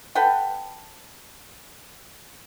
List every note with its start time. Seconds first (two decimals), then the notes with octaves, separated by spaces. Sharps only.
0.15 A4 B4 F#5 G5